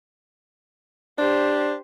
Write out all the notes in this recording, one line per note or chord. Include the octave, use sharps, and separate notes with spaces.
D4 G4 C5